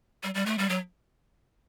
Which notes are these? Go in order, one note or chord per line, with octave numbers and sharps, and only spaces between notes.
G3
G3
A3
G3
F#3